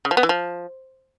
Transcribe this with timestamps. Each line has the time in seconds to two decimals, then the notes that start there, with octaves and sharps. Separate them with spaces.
0.05 C#3
0.11 F3
0.17 B3
0.23 E3
0.29 F3